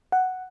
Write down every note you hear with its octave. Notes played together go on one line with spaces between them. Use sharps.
F#5